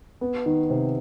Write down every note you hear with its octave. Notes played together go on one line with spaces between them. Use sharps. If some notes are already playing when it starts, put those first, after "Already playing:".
B3
D#3
C3